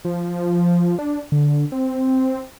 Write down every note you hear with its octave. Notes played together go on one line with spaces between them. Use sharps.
F3
D4
D3
C4